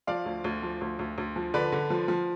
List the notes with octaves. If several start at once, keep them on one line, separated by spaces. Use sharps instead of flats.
F3 D5 F5
D2
D2
F3
D2
D2
D2
F3
D3 B4 D5
D3
F3
F3